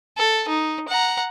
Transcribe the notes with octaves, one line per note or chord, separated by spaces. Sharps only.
A4
D#4
F#5 A#5